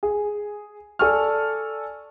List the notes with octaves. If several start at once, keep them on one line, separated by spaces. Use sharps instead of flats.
G#4
A4 D5 G#5 A5 C#6 F6